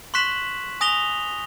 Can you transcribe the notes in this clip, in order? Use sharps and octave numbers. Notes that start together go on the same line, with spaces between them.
C6 C#6 F#6 B6 E7 F#7
G#5 D#6 A#6 F7 G7